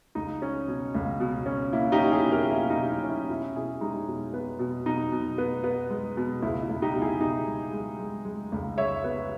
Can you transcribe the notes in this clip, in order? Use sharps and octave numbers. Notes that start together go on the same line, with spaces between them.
C#2 D#4
C#4
B2
C#2
B2
C#4
A#3 E4
D#4 G4
C#4
E4 G#4
B2
G4 A#4
A#3 E4
D#4
B2
E4
C#4
E4
B2 E4
B2 E4 G#4
G#3 D#4 G4
B2
B3
B2
B2 D#4
B2
B3
B3
G#3
B2
C#2 E4
E4
C#2
D#4 G4
B2
E4 G#4
B2 D#4 G4
G#3
G#3
G#3
G#3
C#2
G#3 C#5 E5
B3